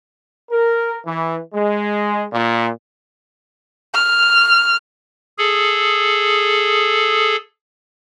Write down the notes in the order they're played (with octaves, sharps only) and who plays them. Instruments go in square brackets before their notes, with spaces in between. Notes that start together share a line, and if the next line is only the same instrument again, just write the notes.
[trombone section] A#4
E3
G#3
A#2
[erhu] F6
[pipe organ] G#4 A4